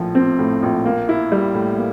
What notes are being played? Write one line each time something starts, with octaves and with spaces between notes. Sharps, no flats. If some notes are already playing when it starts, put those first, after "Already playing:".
Already playing: A#1 A2 F3
C4
A2
A#1
A#3
E4
G3
A2
A#3